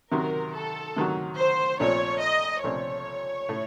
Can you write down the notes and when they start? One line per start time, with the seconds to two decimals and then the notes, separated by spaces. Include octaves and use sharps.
0.12 C3 D#3 F#3 A#4
0.54 A4
0.96 C3 D#3 F#3
1.38 C5
1.80 A#1 A#2 A3 C4 C#5
2.21 D#5
2.64 A#1 A#2 A3 C4 C#5
3.49 A2 A3